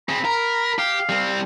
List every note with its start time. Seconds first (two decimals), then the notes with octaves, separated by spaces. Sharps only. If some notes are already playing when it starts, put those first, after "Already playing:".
0.09 C4 G#4 B5
0.25 A#4
0.79 G4 F5
1.09 G3 C4